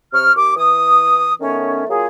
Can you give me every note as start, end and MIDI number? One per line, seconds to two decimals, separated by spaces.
0.13 0.32 48
0.13 0.32 85
0.13 0.32 89
0.36 0.53 39
0.36 0.53 86
0.56 1.33 52
0.56 1.33 87
1.41 1.84 51
1.41 1.84 57
1.41 1.84 59
1.41 1.84 61
1.89 2.07 54
1.89 2.07 58
1.89 2.07 65
1.89 2.07 68